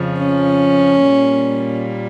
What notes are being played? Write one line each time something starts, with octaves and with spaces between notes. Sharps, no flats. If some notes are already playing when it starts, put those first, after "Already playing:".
Already playing: F2 C#3 F3
C#4
A#2 G3 A#3